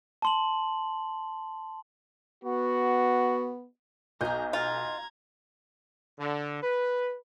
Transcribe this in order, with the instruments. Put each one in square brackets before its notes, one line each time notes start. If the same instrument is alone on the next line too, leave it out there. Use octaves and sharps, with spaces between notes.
[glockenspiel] A5 C6 F#7
[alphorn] B3 [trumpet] F#4
[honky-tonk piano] B1 G6 [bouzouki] D#5 G#5 [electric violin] A#5
[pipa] F4 [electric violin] A#5 G#6
[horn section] D3
B4